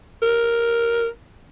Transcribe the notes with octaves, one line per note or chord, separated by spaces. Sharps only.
A#4